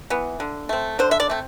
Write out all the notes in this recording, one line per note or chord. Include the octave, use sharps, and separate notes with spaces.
E3 B3
D3
A3 C4
D3 C5
E5
D5
A3 C4